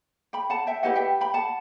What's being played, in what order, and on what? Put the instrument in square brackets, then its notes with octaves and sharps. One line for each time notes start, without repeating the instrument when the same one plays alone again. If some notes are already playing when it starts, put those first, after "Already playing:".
[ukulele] G5 B5
F#5 A5
E5 G5
E4 G4 B4 D#5 F#5
E5 G5
G5 B5
F#5 A5